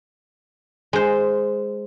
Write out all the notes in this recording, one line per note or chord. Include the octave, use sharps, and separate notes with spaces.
G#3 C5